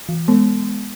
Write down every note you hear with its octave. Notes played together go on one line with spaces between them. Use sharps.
E3
G#3 B3